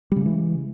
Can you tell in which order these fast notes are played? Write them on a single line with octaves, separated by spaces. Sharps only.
G3 C#3 G#3 E3